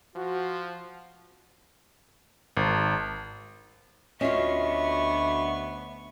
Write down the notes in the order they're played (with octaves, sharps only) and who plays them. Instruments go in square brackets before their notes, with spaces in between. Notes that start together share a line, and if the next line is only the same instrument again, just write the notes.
[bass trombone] F3 [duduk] F#4
[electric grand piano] G#1
[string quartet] D2 B3 C#6 [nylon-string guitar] C#4 F4 [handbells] F#4 D#5 [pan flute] E5